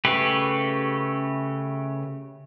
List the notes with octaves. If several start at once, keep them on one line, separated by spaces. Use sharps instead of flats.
C#3 A3 G4 B4